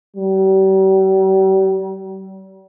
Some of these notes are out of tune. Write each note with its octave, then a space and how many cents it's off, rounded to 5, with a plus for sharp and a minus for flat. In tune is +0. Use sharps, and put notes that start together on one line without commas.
G3 -40